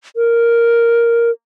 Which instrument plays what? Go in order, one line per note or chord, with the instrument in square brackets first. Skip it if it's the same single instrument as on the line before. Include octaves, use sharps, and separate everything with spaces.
[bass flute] A#4